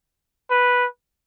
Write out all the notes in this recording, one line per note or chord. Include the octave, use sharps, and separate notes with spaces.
B4